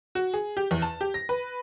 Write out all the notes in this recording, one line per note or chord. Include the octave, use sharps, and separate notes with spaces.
F#4
G#4
G4
E2
A5
G4
A#6
B4